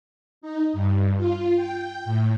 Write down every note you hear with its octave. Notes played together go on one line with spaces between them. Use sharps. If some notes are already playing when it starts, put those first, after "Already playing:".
D#4
G2
F4
G5
A2